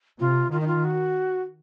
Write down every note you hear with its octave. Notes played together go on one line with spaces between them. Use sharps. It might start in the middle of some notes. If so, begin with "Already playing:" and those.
C3 F4
D#3 F4
D#4
F4
F#4